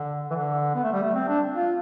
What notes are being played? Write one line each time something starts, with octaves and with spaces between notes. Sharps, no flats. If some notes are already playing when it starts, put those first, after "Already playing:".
Already playing: D3
E3
D3
B3
A3
G3
A3
C4
D4
F4